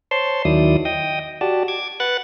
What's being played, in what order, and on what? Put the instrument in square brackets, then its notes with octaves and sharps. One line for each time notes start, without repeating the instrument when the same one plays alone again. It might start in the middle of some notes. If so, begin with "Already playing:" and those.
[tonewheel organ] C5 C#5 A5 C6
D#2 D#3 F#3 E4 D5 D#6
D#5 G5 D#6
F#4 G4 D5 A5
D6 G#6
B4 F#5 F#6 A6